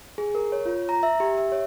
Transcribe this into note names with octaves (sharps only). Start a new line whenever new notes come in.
G#4
A#4
C#5
F4
A#5
E5
G4
E5
C#5